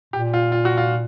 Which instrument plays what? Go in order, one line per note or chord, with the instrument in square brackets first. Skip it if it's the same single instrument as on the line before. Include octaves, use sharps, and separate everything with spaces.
[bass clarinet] A#2 [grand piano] G4
[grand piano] F4
F4
F#4
F4